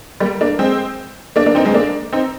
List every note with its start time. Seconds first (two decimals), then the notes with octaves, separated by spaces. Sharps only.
0.20 G3 A#3
0.41 A#3 D4
0.59 G#3 C4
1.36 A#3 D4
1.46 A#3 D4
1.55 C4 D#4
1.65 G#3 C4
1.74 A#3 D4
2.13 C4 D#4